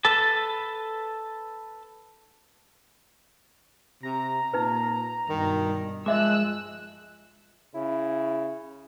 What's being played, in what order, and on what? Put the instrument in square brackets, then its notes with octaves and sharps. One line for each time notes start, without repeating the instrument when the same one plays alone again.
[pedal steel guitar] A4 B4 A5
[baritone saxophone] C3 [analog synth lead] A#5
[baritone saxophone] A#2 [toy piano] D#4 B4
[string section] G2 B2 [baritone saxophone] D#3
[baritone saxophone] F3 [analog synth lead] G#3 [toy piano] D#5 E5 D6 [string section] E6 F#6
[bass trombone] C#3 [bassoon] E4